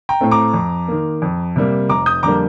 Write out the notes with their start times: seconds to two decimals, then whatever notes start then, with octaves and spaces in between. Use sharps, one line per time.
0.09 G5 A#5
0.21 A2 A3 C4
0.31 A#5 D6
0.54 F2
0.88 D#3 A#3
1.22 F2
1.56 C3 G3 A#3
1.89 F1 A#5 D6
2.06 D#6 G6
2.23 F2 D3 G3 A#3 A#5 D6